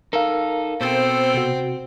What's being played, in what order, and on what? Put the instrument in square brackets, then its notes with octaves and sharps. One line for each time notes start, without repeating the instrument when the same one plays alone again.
[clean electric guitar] D#4 A4 [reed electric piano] A#4 F5
[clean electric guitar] B2 [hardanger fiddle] C4 [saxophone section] A4 C5
[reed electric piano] C3 F#4